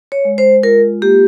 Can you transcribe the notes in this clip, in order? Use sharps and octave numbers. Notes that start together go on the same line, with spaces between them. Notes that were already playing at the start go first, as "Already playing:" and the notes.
C#5
G#3
C5
F4 A#4
A#3 G4